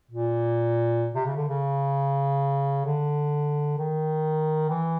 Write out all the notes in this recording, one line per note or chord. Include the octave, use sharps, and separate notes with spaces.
A#2
C3
C#3
D3
C#3
D3
D#3
E3